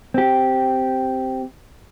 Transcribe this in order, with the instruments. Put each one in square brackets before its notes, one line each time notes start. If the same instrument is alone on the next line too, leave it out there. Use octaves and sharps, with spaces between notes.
[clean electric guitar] C4 G4